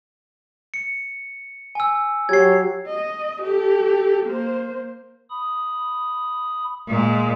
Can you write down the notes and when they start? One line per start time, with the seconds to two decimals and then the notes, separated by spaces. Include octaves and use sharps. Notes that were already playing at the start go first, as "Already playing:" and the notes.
0.74 C#7
1.75 G#5 E6
2.29 F#3 G4 G#6 C7
2.87 D#5
3.42 G4 A4
4.25 A#3 C5
5.30 B5 D#6
6.88 A#2 G#3